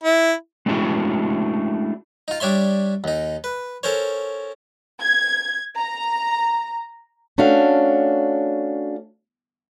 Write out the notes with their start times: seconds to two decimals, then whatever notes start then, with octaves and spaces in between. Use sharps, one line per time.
0.04 E4
0.66 G#3 A3 C#4 D4 E4 F#4
2.28 D#4 F4
2.40 G3 D4 C#5 E5 C6
3.04 D#2 D#4
3.44 B4
3.83 C#4 A4 A#4 C5 C#5
5.01 G#6
5.77 A#5
7.38 A3 C#4 D4 F#4 F5